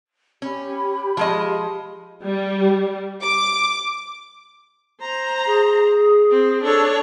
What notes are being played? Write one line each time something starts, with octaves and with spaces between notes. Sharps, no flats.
C#4 G4 B5
F3 G#3 D#5
G3
D6
C5 A#5
G#4
C4
D4 A4 C#5